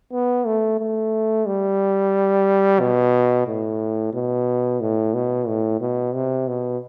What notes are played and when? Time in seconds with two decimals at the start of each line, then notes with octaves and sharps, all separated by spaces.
0.12 B3
0.46 A3
0.80 A3
1.46 G3
2.80 B2
3.47 A2
4.14 B2
4.81 A2
5.14 B2
5.47 A2
5.81 B2
6.14 C3
6.48 B2